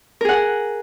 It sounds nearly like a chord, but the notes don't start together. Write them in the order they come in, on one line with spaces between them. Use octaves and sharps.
A#4 G#4 F#5